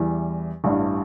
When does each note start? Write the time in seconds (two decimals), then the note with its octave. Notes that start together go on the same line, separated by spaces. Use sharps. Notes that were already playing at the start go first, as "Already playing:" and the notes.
Already playing: E2 E3 G3
0.64 A1 G2 E3 G3 D4